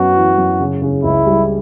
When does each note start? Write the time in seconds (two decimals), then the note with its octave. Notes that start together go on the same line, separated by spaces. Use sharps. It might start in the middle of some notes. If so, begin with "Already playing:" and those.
Already playing: F#2 B3 F#4
0.16 E3
0.38 F#2
0.60 C#3
0.82 C#3
1.03 C#2 E4
1.26 G3